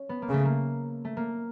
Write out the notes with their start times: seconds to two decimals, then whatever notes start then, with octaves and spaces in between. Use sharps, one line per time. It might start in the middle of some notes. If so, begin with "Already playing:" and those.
Already playing: C#4
0.09 B3
0.22 A#3
0.29 C#3 A3
0.45 A#3
1.05 A3
1.17 A#3